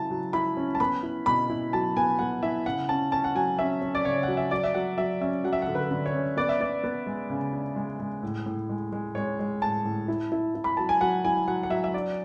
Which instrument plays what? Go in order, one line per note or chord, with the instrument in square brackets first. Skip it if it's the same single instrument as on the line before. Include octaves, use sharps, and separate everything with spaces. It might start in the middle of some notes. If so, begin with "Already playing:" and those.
Already playing: [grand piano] C#3 F#3 E4 A5
F#3
E4 B5
C#4
A5
B3 B5
E4
B2 B5
E4
F#3 A5
B3 G#5
B3 F#5
E4 E5
C#3 F#5
C#4 A5
C#4 A5
F#5
F#3 G#5
C#4 E5
C#4
D5
C#3 C#5
F#3 F#5
E5
F#3 D5
E5
F#3 F#5
F#3 E5
C#4 E5
F#3 F#5
E5
F#5
D3
B4
D3
C#5
C#4
B3 D5
E5
B3 D5
B3
G#3
C#3
D4
G#3
G#3
A2
A2
G#3
G#3
G#3 C#5
G#3
A2 A5
A2
E4
E4
E4
B5
F#3 A5
G#5
F#3 F#5
E4 G#5
F#3 F#5
F#5
F#3 E5
E5
D4 D5